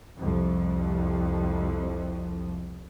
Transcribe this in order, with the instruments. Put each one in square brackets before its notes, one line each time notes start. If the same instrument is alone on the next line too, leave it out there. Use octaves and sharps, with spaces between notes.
[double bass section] C2 F2